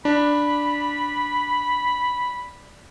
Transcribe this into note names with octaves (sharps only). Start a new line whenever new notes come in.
D4 B5